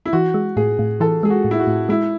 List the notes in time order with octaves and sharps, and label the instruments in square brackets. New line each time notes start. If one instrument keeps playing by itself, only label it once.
[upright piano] E4
[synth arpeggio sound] E3 [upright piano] F#4
[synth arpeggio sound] G#3
[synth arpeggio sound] A2 [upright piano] G#4
[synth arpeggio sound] A2
[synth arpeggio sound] E3 [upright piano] A4
[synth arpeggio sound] G#3 [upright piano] G#4
[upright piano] F#4
[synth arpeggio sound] A2
[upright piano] E4
F#4
[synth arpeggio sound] A2
[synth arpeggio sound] G#3 [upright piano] E4